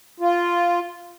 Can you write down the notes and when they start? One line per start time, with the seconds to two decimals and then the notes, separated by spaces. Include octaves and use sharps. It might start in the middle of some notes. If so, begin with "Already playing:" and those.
0.20 F4